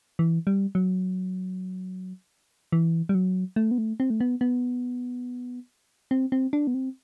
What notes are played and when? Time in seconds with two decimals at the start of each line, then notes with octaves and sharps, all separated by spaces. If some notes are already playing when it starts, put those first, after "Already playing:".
0.19 E3
0.47 G3
0.75 F#3
2.72 E3
3.09 G3
3.15 F#3
3.56 A3
3.71 B3
3.78 A3
4.00 C4
4.10 A3
4.20 B3
4.41 B3
6.11 C4
6.32 C4
6.53 D4
6.67 B3
6.74 C4